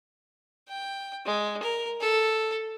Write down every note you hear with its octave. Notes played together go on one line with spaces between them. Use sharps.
G5
G#3
A#4
A4